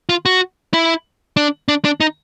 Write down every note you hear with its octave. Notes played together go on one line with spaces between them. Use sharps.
F4
F#4
E4
D4
D4
D4
D#4